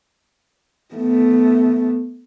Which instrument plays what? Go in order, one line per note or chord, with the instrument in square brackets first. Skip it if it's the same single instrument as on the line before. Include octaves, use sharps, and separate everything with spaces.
[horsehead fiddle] A3 B3